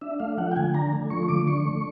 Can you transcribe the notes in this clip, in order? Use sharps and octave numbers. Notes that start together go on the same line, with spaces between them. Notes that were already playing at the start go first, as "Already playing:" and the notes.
D4 E5
A3 F5
F3 F#5
G5
D3 G#5
D4 A#5
A3
F3 C#6
D3 D6
D4 C#6
A3